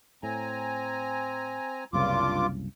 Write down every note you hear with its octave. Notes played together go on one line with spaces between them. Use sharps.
A2 C4 G#5 A#5
F#1 C2 G2 C#3 F4 D6